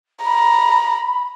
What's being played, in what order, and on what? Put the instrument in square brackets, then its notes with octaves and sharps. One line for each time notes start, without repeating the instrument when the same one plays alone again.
[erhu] A#5 [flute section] B5